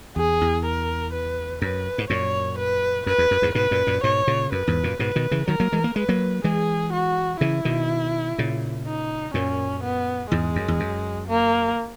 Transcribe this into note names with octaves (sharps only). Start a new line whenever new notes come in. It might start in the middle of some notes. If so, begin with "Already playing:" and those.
E2 G#4
E2
A#4
B4
F#2 B4
G#2
F#2 A#2 C#5
B4
F#2 B4
E2
F#2
E2 G#2
G#2 B2 B4
F#2 A#2
F#2 A#2
G#2 B2 C#5
A#2 C#3
F#2 B4
E2 G#2
F#2 A#2
G#2 B2 B4
B2 D#3
C#3 E3
D#3 F#3 A#4
F#3 A#3
E3 G#3
A#3
G#3 B4
F#3 A#3
E3 G#3 G#4
F#4
C#3 E3 E4
B2 D#3
A#2 C#3
D#4
F#2 A#2 C#4
B3
E2 G#2 G#3
F#2
E2
F#2
A#3